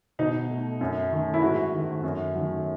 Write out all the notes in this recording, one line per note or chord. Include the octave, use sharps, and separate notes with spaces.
B2 D#4
A3
F#2
D#3 A3
E4
G#2 F#4
D#3 A3
F#2
D#3 F#3 A3